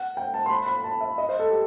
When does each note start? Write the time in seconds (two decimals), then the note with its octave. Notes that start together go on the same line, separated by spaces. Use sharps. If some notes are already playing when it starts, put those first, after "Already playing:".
Already playing: F#5
0.17 G5
0.34 A5
0.46 C6
0.50 B5
0.66 B5
0.84 A5
1.01 E5
1.18 D#5
1.29 C5
1.39 A4
1.51 G4